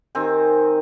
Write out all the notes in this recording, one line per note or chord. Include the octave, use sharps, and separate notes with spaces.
D#3 C4 G#5